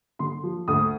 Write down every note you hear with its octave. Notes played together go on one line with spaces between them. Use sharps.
D3 C6
F3
D2 D#6